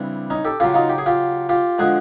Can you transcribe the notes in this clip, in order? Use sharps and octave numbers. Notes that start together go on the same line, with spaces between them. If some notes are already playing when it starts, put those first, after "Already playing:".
Already playing: C#3 E3 G3 C4 D4
C#4 D#4
G4 A4
C#3 F#3 F4 G4
D#4 F4
G4
G#4
F4 G4
F4 G4
D3 F3 G#3 F#4 G#4